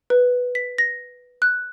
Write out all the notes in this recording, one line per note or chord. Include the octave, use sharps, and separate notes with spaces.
B4
B6
A#6
F#6